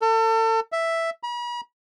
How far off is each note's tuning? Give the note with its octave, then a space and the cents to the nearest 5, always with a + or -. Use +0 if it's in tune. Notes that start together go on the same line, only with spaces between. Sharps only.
A4 +35
E5 +0
B5 -45